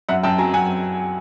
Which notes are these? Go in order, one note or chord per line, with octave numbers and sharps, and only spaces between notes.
F#2 E5 F#5
F#2 G5 A5
F#3 G#5 A#5
F#2 F#5 G#5